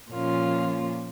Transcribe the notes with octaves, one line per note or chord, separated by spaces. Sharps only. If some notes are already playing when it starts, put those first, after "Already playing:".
A#2 F3 A#3 C#4 F4